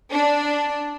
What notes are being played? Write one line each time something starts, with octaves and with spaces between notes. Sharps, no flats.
D4